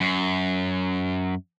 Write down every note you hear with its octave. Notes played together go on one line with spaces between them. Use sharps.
F#2